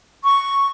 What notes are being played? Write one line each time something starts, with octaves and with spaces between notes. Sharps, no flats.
C#6